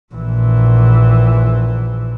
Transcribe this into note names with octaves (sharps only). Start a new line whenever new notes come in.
A#1 E3